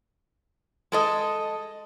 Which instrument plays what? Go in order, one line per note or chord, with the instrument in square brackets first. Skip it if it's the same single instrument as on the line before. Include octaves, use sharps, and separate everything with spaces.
[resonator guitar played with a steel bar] G#3 A4 D#5